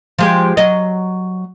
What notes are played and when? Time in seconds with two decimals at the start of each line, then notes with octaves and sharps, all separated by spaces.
0.18 F3 G#3 G4
0.57 F#3 D#5